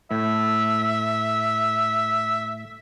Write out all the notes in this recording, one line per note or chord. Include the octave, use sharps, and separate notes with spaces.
A2 E5